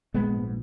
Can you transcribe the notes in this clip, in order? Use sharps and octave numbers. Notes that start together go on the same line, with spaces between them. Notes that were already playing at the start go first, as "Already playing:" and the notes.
A#1 G#3 B3
G#2